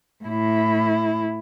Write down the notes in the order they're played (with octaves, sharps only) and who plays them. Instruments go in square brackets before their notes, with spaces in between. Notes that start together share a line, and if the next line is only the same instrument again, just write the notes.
[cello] A2 E4